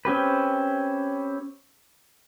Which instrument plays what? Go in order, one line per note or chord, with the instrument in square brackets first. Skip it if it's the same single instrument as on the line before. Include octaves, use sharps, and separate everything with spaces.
[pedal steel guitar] C4 C#4 G4 B4